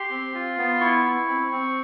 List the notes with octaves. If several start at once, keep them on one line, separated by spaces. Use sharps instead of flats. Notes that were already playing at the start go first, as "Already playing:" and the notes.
Already playing: G4 C6
C4
F4
B3
E4 C#6
E4
C4
C4